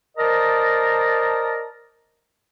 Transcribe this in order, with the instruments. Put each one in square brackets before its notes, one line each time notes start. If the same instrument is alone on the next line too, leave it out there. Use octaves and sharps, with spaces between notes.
[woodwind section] A#4 C5 D5 D#5 A5 A#5